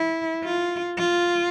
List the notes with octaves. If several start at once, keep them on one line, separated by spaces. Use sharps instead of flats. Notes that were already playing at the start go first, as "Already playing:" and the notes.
Already playing: E4
F4
F4